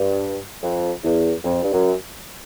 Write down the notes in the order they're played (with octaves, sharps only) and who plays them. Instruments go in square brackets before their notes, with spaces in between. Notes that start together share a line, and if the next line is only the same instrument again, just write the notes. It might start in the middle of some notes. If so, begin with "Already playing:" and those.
Already playing: [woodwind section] G2
F2
E2
F2
G2
F#2